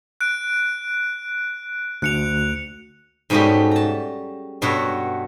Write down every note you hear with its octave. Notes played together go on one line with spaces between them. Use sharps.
F#6 D7
D2 F#6 C#7 F7
G#2 B2 G3 A3 C#4 G4
A5 A#5
G2 B2 A4 C#5 F#5